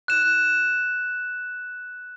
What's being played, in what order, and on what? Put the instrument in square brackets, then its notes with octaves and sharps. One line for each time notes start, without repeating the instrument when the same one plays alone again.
[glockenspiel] F#6 E7